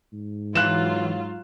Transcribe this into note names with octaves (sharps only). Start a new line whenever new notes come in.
G#2
E3 F#3 F4 F#6 E7